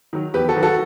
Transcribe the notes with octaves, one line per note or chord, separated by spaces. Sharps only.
D#3 F#3
E2 G4 B4
F#4 A4
D#3 F#3
F#4 A4